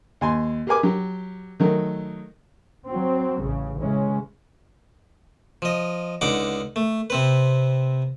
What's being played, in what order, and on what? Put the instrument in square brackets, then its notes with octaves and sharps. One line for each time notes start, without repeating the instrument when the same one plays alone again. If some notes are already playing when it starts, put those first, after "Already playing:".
[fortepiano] D#2 G#5 C6
G4 G#4 A#4 B4 G#5 D6
F#3 G4
D#3 F#3 A3
[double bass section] F#3 C4
A1 C#3
C#3 E3 G#3 C#4
[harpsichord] F3 D#5
C#2 D3 D#4 F#5 D6
A3
C3 C4 B4